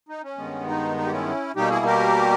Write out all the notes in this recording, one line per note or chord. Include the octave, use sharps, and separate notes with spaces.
D#4
C#4
G2 D#3 G#3 B3
D#4
D#4
G4
C#4 E4
B2 G3 A#3 D#4 G4
E4 G#4
G4 A#4